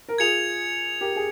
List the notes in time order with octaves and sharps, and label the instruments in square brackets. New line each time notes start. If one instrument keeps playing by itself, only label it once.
[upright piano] A#4
[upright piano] F4 G#4 [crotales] G#6 C#7 F7
[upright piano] G4 A#4
G#4